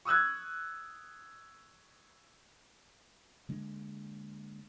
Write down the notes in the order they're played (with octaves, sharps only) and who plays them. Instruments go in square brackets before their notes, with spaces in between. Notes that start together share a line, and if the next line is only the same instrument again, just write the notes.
[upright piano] C#6 D#6 E6 F#6 G#6
[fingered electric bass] D3 G#3 A#3 D4